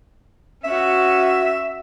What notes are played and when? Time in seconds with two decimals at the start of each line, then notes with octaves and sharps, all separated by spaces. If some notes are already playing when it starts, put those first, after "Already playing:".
0.64 C#4 F#4 E5